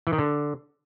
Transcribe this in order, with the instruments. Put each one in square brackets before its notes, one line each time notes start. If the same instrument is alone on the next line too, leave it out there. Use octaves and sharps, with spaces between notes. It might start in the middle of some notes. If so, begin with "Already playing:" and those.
[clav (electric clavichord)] E3
D#3
D3